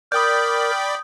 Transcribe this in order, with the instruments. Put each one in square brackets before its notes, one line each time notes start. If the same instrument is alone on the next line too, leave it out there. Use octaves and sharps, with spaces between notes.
[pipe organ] A#4 [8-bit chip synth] D5 G5 B5 [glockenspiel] D#6 G6